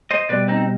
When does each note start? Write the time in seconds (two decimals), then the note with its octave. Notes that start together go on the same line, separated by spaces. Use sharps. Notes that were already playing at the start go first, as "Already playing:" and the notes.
0.11 C5 D#5
0.29 B2 G3 B4 D5
0.48 C4 D#4